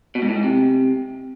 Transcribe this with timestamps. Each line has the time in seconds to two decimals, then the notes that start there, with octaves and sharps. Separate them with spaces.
0.15 B2
0.22 G#2
0.29 A2
0.36 G#2
0.43 C3